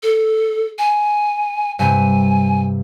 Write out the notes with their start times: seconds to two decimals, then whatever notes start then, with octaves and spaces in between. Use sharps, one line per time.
0.03 A4
0.79 G#5
1.79 G2 C3 G#5